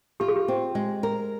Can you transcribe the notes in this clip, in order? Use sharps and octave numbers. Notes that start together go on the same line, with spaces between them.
F4 G4
G#4
G4
C4
G#3
A#4